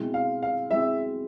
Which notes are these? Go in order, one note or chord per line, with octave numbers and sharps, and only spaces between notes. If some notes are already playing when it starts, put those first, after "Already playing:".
Already playing: B2 G#3 C4 E4
F5
F5
G#3 C4 E4 E5